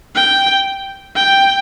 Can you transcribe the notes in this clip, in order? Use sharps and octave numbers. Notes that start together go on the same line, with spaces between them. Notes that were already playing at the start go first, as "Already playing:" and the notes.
G5
G5